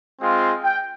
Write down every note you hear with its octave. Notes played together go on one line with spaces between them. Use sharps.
G#3 C4 F4
G5